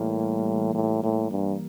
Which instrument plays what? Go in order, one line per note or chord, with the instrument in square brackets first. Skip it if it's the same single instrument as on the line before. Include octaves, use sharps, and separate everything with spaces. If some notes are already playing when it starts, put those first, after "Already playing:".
Already playing: [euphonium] A2 [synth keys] E3 G3 A#3
[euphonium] A2
A2
G2